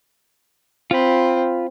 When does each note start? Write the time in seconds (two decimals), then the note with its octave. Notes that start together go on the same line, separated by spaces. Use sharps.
0.91 C4 F4 B5